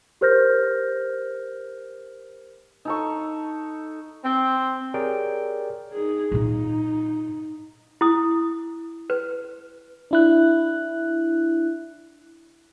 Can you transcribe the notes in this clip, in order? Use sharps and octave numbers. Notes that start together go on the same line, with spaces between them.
G4 A#4 C5 F6 G6 A#6
D#4 A4 C#6
C4
G4 G#4 A#4 C#5 D5 G5
D#4 G#4
A#2 D#4 F4
E4 D#6
B4
D4 E4 F#6